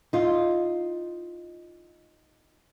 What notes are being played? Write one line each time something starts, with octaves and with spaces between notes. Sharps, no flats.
D#4 F4